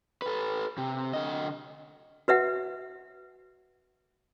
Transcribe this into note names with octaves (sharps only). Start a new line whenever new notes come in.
A4 B4
C3
D3 D#5
F#4 B4 E5 F#5